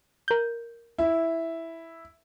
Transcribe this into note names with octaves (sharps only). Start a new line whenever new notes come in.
A#4 G6
E4